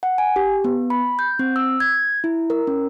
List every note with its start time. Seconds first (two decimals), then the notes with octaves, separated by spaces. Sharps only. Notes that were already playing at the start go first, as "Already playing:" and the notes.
0.03 F#5
0.18 G#5
0.36 G4
0.65 B3
0.90 B5
1.19 G6
1.39 C4
1.56 E6
1.80 G#6
2.24 E4
2.50 A#4
2.67 C#4